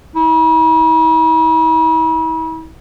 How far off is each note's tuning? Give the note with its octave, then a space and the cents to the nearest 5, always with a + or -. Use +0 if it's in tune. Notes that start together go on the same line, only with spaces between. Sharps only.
E4 -45